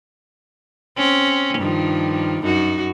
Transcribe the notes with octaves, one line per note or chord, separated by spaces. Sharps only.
C4 C#4
G2 D#3 F3
F#2 D#4 F#4